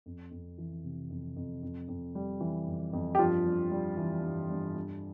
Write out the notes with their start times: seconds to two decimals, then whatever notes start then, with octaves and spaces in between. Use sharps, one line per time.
0.06 F2
0.31 F2
0.58 E3
0.84 C3
1.10 F2
1.36 F2
1.63 F2
1.88 F2
2.15 G3
2.41 E3
2.67 F2
2.93 F2
3.15 G4
3.19 G2 F3 F4
3.46 G2
3.71 G3
3.97 E3
4.23 G2
4.50 G2
4.76 G2